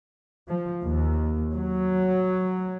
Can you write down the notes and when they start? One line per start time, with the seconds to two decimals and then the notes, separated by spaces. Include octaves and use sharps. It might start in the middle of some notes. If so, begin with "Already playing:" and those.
0.49 F3
0.83 D#2
1.54 F#3